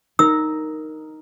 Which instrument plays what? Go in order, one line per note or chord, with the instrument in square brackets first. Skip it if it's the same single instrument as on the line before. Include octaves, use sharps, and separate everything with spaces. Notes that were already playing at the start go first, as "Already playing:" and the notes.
[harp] D#4 A#4 [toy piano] E6